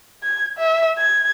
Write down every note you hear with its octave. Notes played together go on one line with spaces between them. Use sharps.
G#6
E5
G#6